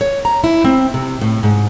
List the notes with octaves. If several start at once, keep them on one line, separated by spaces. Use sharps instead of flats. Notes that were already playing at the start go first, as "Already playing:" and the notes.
C#5
A#5
E4
C4
C3
A2
G#2